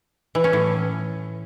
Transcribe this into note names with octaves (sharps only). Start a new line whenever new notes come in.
E3
C#4
A2